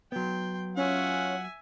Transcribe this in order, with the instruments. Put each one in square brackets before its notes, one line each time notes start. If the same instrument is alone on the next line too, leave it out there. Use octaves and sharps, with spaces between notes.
[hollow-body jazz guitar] F#3 B3 [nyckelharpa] G5 C6
[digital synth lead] C#4 [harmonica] F4 F#5 [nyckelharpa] E5 G#5